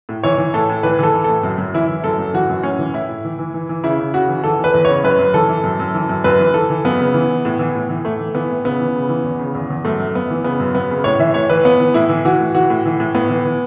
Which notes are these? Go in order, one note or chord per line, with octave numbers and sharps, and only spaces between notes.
A2
E3 C#5
E3
A2 A4
A2
E3 B4
E3 A4
E3
A2 A4
F#2
F#2
E3 E4
E3
F#2 A4
F#2
E3 F#4
F#2
A2 C#4
E3
A2 E4
A2
E3
E3
E3
E3
C#3 E4
C#3
C#3 F#4
E3
E3 A4
E3 B4
E2
C#3 C#5
F#2 B4
F#2
E3 A4
E3
F#2
F#2
E3
F#2
F#2 B4
E3
E3 A4
E3
F#2 B3
C#3
E3
E3
A2
E3
A2
E3
A2 A3
E3
E3 B3
A2
C#3 B3
E3
C#3
E3
E2
C#3
E2
E2
F#2 A3
F#2
F#2 B3
E3
C#3 B3
F#2
F#2 B3
C#3
A2 C#5
E3 E5
A2 C#5
E3 B4
E3 B3
E3
A2 E4
E3
E3 F#4
A2
E3 F#4
A2
E3
A2
A2 B3
E3
E3